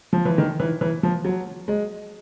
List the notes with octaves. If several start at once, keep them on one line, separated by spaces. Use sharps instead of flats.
F3
E3
D#3
E3
E3
F3
F#3
G#3